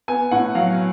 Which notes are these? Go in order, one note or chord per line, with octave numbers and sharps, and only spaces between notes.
B3 G#5
A2 F#5
F#3 F5